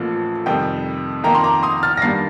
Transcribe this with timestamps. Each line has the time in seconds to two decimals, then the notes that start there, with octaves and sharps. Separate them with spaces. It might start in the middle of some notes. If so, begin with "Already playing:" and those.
Already playing: A1 A2 F3 A#3
0.46 F2 C3 D#3 G3 G5
1.24 F2 D#3 A#3 G5 A#5
1.35 C6
1.44 A#5 D6
1.63 C6 D#6
1.83 F6 A6
1.97 A#6
2.02 G2 D#3 G3 A#3 A6 C7